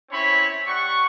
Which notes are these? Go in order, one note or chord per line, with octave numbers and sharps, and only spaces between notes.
C4 C#4 E4 C#5 B5
G3 F#5 C#6